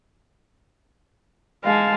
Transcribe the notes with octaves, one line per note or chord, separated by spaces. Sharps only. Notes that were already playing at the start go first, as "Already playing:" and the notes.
G#3 F5 A5